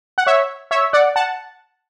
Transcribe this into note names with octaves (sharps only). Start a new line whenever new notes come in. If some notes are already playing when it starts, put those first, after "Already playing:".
F#5
C#5 E5
C#5 E5
D5 F#5
F#5 A5